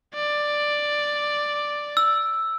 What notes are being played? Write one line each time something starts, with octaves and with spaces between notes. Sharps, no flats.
D5
E6